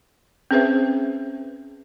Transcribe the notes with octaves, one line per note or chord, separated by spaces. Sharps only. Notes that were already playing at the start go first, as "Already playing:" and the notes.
C4 C#4 G#4 B4 C5 E5